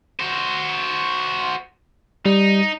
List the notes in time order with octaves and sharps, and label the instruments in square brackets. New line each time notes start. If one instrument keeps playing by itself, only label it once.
[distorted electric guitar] F#4 C5
[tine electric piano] G3 [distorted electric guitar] D#4